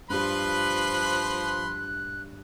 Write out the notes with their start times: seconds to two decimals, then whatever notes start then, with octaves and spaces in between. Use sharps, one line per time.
0.10 G2 F3 G3 B4 B5 C6 F#6